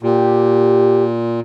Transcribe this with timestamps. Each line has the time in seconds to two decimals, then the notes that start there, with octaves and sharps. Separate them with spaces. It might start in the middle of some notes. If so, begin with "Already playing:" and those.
0.03 A#2 G4